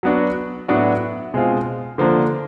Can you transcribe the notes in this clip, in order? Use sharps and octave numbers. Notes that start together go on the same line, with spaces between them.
F#3 B3 D4 F#4
A2 F#3 B3 D4 F#4
B2 G#3 C4 F4
D3 F3 A#3 D4